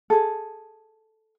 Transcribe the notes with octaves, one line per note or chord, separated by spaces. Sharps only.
G#4 A4